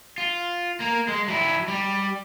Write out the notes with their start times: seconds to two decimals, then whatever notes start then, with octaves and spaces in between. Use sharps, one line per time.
0.18 F4
0.80 A#3 A#4
1.08 G#3
1.28 F#3 E4
1.68 G3